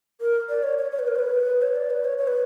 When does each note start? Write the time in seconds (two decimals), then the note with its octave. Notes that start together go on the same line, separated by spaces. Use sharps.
0.21 A#4
0.49 D5
0.63 C#5
0.78 C#5
0.92 C#5
0.99 B4
1.07 A#4
1.15 C#5
1.19 B4
1.62 C#5
1.75 D5
1.90 B4
2.05 C#5
2.18 C#5
2.27 B4